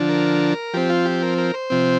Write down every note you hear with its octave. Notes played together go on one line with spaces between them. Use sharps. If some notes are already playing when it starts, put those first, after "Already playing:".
Already playing: D3 F3 D4
A#4
F3 C4 G4
F4
G4
A#4
A#4
C5
C3 F3 C4